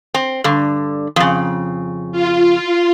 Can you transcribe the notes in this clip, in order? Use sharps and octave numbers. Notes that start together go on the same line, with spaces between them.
C4
G2 D3
F2 C#3
F4